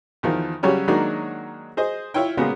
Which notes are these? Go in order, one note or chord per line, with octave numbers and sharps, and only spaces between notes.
E2 D#3 F3
C#3 F#3 G3 C#4 G4
D#3 F#3 G#3 A#3 D4 D#4
G#4 C5 D#5
E4 F4 C#5 G5
A#2 C#3 G#3 A#3 B3